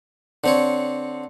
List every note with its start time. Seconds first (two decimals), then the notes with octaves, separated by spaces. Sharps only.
0.44 D3 C4 C#5